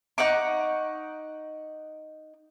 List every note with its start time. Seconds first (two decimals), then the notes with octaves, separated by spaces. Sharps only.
0.18 D#4 F#5 C#6 D6